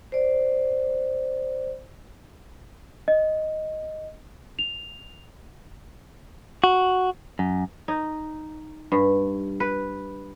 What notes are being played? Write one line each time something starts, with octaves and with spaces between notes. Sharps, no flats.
C5 D5
D#5
F7
F#4
F#2
D#4
G2
B4